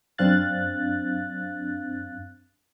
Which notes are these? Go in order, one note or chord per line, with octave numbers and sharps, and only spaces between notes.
F#2 C4 D4 F5 F#6 A6